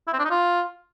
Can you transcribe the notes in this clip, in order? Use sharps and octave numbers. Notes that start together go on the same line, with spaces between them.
E4
C4
D4
D#4
F4